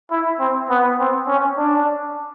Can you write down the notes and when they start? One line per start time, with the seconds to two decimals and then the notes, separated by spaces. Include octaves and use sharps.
0.11 E4
0.40 C4
0.70 B3
0.99 C4
1.27 C#4
1.57 D4